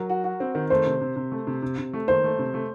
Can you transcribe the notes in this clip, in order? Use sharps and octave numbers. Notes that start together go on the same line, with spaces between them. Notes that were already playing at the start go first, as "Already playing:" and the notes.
Already playing: F#3 A#4
F#4
F#4
C4
D#3
A3 C5
C3
C3
C3
A3
C3
C3
C3
A3
D#3 C5
A3
C3
A3